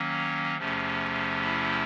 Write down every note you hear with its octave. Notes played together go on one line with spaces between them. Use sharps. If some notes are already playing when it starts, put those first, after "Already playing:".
Already playing: D#3 F#3 A#3 C#4
E2 C3 F3 A3 C#4
E4